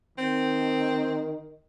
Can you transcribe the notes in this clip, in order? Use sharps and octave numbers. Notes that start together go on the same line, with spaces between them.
D#3 C4